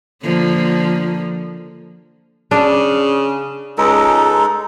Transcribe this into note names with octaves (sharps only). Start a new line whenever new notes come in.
D3 F3 A#3
C#3 D4
C#2 G#3 D#4 A4 A#5